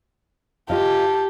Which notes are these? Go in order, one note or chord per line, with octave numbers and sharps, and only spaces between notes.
F4 G4 D#5 F5 A5